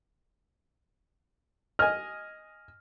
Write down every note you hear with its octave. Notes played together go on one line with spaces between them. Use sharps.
D#5 G#5 F6